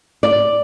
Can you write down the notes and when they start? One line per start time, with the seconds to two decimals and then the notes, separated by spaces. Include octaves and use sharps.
0.23 D5